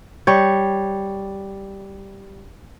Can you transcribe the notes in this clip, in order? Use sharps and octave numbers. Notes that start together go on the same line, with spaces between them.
G3 C#5